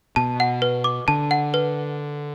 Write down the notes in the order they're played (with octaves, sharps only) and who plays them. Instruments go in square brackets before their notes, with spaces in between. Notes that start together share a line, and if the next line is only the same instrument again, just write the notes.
[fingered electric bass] B2 [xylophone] A5
[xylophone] F#5
B4
D6
[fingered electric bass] D3 [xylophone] A5
[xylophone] F#5
B4